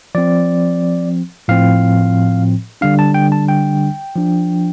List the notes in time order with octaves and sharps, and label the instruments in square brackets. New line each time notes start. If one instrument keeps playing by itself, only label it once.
[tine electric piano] F3 C4 D5
A2 F3 C4 F5
D3 G3 D4 F5
A5
G5
A5
G5
F3 D4